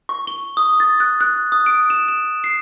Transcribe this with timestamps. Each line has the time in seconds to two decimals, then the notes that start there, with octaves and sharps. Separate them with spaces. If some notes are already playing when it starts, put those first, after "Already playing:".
0.09 C#6
0.27 G7
0.57 D#6
0.80 A6
1.00 F#6
1.21 F#6
1.52 D#6
1.66 D7
1.90 E7
2.08 E7
2.44 C7